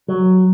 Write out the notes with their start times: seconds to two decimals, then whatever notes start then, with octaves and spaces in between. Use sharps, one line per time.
0.08 F#3